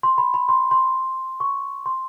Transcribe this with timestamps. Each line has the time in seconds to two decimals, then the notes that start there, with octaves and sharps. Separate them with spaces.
0.03 C6
0.18 B5
0.34 B5
0.49 C6
0.71 C6
1.40 C#6
1.86 C6